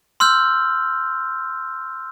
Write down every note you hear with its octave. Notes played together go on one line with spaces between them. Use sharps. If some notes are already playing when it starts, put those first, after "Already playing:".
C6 E6 F6 G6